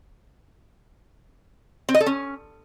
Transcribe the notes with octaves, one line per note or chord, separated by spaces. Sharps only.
C4
D#5
A4
C#4